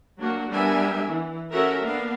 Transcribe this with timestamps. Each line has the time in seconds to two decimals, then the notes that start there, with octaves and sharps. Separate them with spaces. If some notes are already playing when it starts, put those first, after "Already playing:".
0.17 F#3 A#3 D4 F#4
0.49 G3 B3 D4 A#4 E5 G#5
1.08 E3
1.50 C#4 F#4 A4 A#4 E5
1.81 A#3 B3 D4 F5